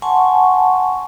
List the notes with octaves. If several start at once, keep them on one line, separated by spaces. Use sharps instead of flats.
F#5 G#5 A5 C6 C#6